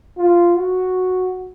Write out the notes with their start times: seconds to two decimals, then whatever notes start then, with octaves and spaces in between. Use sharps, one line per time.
0.17 F4
0.57 F#4